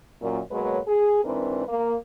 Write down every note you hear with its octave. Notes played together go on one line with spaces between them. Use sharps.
F#2 A#2
B2 F#3 G#3 A#3 B4 C#5
G#4
G#2 E3 C4 D4 A#4 B4
A#3